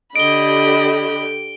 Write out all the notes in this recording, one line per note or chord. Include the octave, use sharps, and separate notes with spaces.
D3 G4 D#5 B5 D7 G7